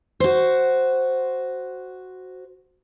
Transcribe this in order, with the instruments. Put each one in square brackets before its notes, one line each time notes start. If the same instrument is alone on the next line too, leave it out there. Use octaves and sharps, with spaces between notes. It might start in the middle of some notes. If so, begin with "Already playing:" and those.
[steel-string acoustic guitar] F#4 C5